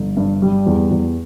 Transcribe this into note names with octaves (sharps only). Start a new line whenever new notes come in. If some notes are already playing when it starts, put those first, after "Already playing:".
Already playing: G1
G2
G3
E2
E2